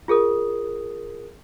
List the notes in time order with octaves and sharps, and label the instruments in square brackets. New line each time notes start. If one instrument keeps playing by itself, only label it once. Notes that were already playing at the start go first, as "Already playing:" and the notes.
[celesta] F4 G#4 A#4 D#6